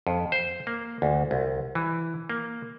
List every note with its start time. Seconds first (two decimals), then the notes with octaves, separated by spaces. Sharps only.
0.07 F2
0.32 C5
0.67 A#3
1.02 D2
1.31 C2
1.75 E3
2.30 A#3